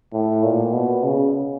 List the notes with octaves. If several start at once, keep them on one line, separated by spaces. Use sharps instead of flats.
A2
A#2
B2
C#3